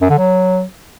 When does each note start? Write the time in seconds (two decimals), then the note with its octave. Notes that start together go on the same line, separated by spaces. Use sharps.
0.02 F#2
0.10 D3
0.18 F#3